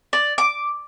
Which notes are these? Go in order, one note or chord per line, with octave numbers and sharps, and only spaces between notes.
D5
D6